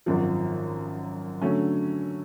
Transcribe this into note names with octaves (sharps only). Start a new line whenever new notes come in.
G#1 F#2 F3
D3 F#3 A3 C#4